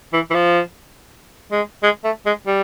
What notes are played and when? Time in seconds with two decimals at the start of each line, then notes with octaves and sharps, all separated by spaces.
0.13 E3
0.31 E3
0.34 F3
1.52 G#3
1.83 G#3
2.04 A3
2.26 G#3
2.47 G3